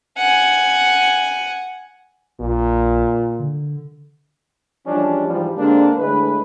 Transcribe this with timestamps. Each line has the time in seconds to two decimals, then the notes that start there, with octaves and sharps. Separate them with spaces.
0.17 F#5 G#5
2.40 A#1 A#2
3.39 D3
4.86 E3 F3 G3 G#3 C#4 D4
5.27 G#2 E3 F3 G3
5.57 D3 G#3 A#3 C4 D4
5.97 A2 D3 G#3 B4